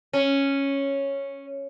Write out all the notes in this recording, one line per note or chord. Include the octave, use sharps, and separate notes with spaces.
C#4